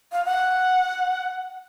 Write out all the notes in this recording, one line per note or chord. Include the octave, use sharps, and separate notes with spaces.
F5
F#5